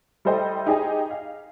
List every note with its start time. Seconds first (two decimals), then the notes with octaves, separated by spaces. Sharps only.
0.25 G3 E4 A4 C5 D#5 G5
0.67 D#4 G4 G#4 D#5 G#5
1.11 F5